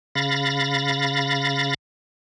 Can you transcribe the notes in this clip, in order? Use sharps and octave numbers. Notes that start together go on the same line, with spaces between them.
C#3 F5 B5 A6 A#6